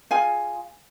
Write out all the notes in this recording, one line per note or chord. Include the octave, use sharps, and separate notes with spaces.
F4 G#4 F5 G#5